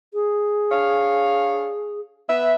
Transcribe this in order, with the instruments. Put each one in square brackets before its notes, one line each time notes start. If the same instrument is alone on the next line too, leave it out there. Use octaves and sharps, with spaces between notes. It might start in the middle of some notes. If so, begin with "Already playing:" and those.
[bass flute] G#4
[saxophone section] D4 C#5 F5
B3 B4 E5